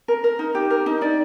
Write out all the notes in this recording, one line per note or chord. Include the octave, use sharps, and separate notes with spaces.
A#4
A#4
D#4
G4
A#4
D#4
D#4 D5